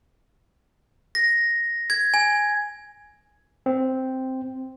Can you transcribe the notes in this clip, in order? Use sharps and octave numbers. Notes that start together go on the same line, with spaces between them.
A#6
G#6
G#5
C4